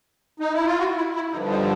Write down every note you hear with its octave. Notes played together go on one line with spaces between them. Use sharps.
D#4
E4
F4
F#4
E4
E4
G2 D3 F3 D#4
D#4